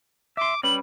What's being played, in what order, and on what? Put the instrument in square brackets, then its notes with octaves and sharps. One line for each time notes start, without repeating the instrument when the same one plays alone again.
[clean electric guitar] E5 C6 [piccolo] D6
[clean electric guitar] G3 C#4 B4 [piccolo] F#7